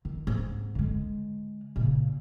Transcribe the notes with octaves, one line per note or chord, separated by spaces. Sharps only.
D#3
G#2 C4
D3 G#3
A#2 C#3